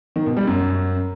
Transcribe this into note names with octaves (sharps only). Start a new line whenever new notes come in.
D#3
B2
G3
F#2